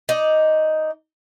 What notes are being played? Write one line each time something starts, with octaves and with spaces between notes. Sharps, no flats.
D#4 D5